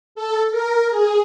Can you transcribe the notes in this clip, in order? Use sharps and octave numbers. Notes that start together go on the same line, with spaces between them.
A4
A#4
G#4